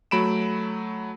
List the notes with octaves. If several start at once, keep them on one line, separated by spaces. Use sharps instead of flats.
F#3 A3 B5 D7 E7